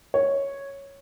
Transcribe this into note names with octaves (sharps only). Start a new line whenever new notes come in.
C#5